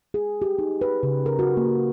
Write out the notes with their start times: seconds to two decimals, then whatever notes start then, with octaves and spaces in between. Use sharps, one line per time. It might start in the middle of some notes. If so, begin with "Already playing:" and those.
0.14 G#4
0.42 G4
0.59 D#4
0.81 B4
1.03 C#3
1.26 A#4
1.39 F#4
1.57 A#3